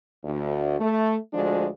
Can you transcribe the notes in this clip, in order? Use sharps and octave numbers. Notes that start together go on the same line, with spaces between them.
D2
A3
D2 F3 G#3 D4